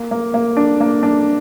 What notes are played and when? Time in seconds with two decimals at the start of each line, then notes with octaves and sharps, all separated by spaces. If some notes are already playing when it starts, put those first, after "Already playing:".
Already playing: A#3
0.11 A#3
0.34 A#3
0.57 D4
0.80 A#3
1.03 D4